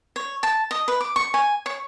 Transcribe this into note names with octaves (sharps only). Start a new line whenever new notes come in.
C#5
A5
D#5
B4
D6
C#6
G#5
C#5